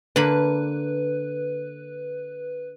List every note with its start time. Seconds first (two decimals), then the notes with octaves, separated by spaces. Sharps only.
0.16 D3 A#3 B4 B5